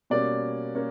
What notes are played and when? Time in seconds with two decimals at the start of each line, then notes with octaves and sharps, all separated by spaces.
0.10 B2 G3 A#3 C#4 D5
0.75 A#3 C#4